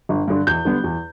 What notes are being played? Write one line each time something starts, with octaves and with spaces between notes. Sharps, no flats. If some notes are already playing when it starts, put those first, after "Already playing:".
G1
G2 D3
E2 G6
D3 G3 B3
E2